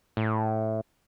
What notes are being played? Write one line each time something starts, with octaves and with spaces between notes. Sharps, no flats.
A2